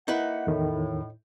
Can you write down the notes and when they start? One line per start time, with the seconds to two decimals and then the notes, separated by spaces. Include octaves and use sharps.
0.08 A#3 D#4 E4 B4 F#5
0.47 E2 A2 D#3